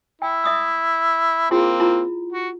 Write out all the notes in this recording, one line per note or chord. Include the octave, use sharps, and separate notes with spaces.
E4 G5
E5 D#6 E6
A#3 C4 E4 F4 G#4
E4 F4 A#5
F#4